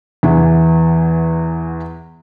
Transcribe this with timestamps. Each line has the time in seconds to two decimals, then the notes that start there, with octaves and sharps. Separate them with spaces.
0.23 E2 E3 B3